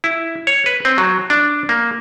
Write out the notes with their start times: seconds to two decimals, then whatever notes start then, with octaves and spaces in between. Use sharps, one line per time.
0.04 E4
0.47 C#5
0.66 B4
0.85 C4
0.98 F#3
1.30 D4
1.69 A#3